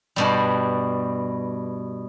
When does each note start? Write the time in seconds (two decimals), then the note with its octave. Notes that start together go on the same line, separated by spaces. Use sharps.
0.16 G2 B2 G3